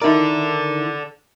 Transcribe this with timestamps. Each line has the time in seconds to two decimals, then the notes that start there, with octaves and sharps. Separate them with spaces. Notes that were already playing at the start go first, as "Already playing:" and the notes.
0.02 D#3 E4 A4 A#4 D5